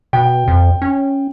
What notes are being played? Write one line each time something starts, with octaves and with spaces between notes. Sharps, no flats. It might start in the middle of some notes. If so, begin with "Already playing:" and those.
B2 G5
F2
C#4